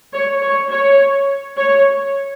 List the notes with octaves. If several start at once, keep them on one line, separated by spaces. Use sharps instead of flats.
C#5
C#5
C#5
C#5